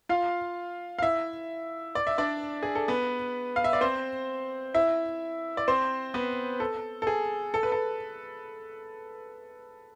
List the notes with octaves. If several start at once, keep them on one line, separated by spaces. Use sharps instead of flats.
F4 F5
F5
E4 E5
D5
E5
D4 D5
G#4
A4
B3 B4
F5
E5
D5
C4 C5
E4 E5
D5
C4 C5
B3 B4
A4
A4
G#4
A4
B4
A4